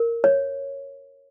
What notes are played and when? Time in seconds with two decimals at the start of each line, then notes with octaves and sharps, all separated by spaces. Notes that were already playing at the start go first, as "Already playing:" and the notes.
Already playing: A#4
0.24 C#5